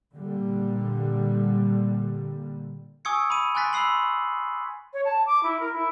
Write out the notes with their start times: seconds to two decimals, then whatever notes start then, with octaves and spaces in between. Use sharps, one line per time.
0.13 A#2 D3 G3
3.05 G#5 C#6 D#6 E6 G#6 C#7
3.30 B5 D#6 D#7
3.55 G#5 C6 F#6 A6 B6
3.73 B5 C6 E6 C7 F#7
4.93 C#5
5.05 A5
5.26 D6
5.43 E4
5.59 A#4
5.73 E4